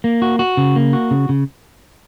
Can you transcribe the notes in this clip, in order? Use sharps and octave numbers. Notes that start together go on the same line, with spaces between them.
A#3
F#4
F#4
C#3
A#3
F#4
C#3
C#3